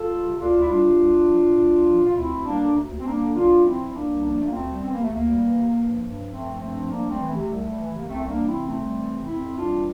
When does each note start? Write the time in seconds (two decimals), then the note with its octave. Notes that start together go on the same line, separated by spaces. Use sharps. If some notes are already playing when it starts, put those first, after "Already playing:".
Already playing: F4 A4
0.09 G3
0.25 C3
0.39 D2 D4 F4
0.54 D2
0.61 E4
0.68 G3 D4 F4
0.84 C3
0.98 C2
1.13 C2
1.27 F3
1.43 A#2
1.58 C2
1.73 C2
1.87 F3
2.02 A#2 F4
2.16 D2 C4 E4
2.32 D2
2.46 G3 A#3 D4
2.61 D3
2.76 D2
2.90 D2
3.00 C4
3.05 G3 A#3 D4
3.21 D3
3.34 C2 D4 F4
3.49 C2
3.64 F3 C4 E4
3.80 A#2
3.94 C2 A#3 D4
4.09 C2
4.24 F3 A#3 D4
4.38 A#2 A3
4.46 A#3
4.53 D2 A3 C4
4.68 G3
4.82 E3 C4
4.93 C3 A#3
5.03 A3
5.12 D2 A#3
5.27 G3
5.42 E3
5.57 C3
5.71 G2
5.87 F3
6.01 G2
6.16 F3
6.30 G2 A3 C4
6.45 F3
6.60 G2 A3 C4
6.76 F3
6.90 C2 A#3 D4
7.05 G3 A3 C4
7.20 E3
7.29 A3
7.35 C3
7.49 C2
7.64 G3
7.78 E3
7.93 C3 A#3
8.08 C2 A3 C4
8.24 G3 A#3 D4
8.38 E3
8.47 C4 E4
8.53 C3
8.67 C2 A3 C4
8.82 G3
8.97 E3
9.12 C3
9.26 F2 C4 E4
9.41 F2
9.56 G3 D4 F4
9.71 E3